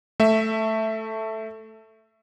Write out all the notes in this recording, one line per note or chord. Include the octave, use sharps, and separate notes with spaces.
A3 E5